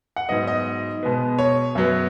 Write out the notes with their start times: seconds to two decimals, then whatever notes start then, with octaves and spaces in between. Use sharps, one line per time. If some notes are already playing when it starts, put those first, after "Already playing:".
0.16 F#5
0.29 G#2 F#3 B3 D#5
0.47 D#5
1.03 B2 G#3 B3
1.39 C#5
1.75 F#2 F#3 B3